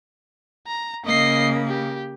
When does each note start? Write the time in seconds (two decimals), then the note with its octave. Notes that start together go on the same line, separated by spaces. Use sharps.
0.67 A#5
1.05 C#3 A#3 D#5 C7
1.68 G4